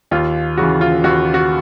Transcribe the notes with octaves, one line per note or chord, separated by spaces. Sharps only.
D#2 F4
C#3 E3 F#4
F4
D#2 F#4
F#4